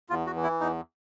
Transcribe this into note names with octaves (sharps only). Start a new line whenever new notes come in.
E2 F4
F#4
E3
E4
E2 D#4